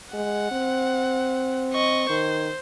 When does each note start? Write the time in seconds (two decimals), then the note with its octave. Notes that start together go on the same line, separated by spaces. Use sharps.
0.14 G#3 F#5
0.52 C4
1.74 D#5 C#6
2.10 D#3 C5